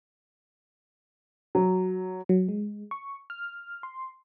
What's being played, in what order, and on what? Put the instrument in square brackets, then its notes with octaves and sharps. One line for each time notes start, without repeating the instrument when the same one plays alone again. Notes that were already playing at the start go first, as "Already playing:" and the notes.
[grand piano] F#3
[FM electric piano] F#3
G#3
C#6
F6
C6